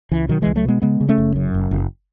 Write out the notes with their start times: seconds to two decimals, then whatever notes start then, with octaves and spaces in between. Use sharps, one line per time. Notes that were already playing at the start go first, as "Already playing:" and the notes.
0.11 C#2 E3
0.28 B2 D#3 F#3
0.42 C#2 E3 G#3
0.56 F#3 A3
0.65 B2 G#3 B3
0.82 C#3 G#3 B3
1.01 C#3
1.09 A3 C#4
1.18 F#1
1.36 F#2
1.54 F#1
1.71 F#1